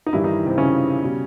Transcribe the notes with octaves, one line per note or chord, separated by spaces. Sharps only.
D#4
G2 D#3 E3 G3 E4
D#3 D#4
C3 C4
C#3 C#4
B2 G3